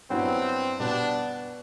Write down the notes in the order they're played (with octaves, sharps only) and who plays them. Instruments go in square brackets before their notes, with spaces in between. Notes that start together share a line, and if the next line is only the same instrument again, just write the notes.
[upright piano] G2 F#3 B3 E4 [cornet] C4
[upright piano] B2 G3 B3 [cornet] D4